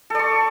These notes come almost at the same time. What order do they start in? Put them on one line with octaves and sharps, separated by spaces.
A4 D5 C#6